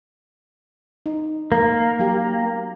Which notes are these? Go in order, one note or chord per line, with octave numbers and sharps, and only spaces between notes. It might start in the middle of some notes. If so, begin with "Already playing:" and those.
D#4
A#3 A#4
F#3 G4